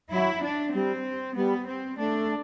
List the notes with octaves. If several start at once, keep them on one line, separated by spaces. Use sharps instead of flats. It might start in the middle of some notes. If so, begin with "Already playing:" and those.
F#3 E4
D4
G3 C4
G3 B3
C4
A3 D4